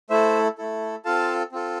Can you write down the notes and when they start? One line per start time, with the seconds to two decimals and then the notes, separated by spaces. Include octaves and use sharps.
0.10 A3 E4 A4 C5 E5
0.58 A3 E4 A4
1.05 C4 F4 A4 F5 A5
1.52 C4 F4 A4